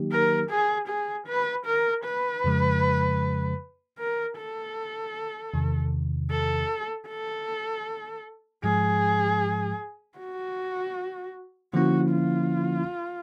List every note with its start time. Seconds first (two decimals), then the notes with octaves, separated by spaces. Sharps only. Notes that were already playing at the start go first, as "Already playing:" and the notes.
Already playing: D#3 F#3 A#3 D#4 G4
0.12 A#4
0.51 G#4
0.89 G#4
1.28 B4
1.67 A#4
2.05 B4
2.44 F2 C#3 F3 G#3
3.99 A#4
4.38 A4
5.54 E2 C3 D#3
6.31 A4
7.09 A4
8.64 G#2 F3 G#3 G#4
10.19 F#4
11.74 D3 F3 A#3 C#4 E4 F#4
12.13 F4